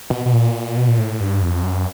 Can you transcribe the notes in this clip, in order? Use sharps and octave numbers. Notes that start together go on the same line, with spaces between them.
B2
B2
A#2
B2
A#2
A2
G2
F2
F#2